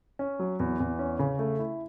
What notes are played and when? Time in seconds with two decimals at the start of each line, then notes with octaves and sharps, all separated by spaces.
0.19 C#4
0.39 F#3
0.60 E2
0.80 E2
0.99 C#4
1.19 C#3
1.39 A3
1.59 E4